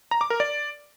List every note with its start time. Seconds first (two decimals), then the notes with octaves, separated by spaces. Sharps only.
0.11 A#5
0.21 D6
0.30 A#4
0.40 D5